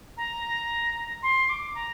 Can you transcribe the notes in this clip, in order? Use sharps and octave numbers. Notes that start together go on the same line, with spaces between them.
A#5
C6
D6
A#5